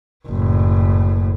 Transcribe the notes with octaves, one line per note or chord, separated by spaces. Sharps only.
F#1 A2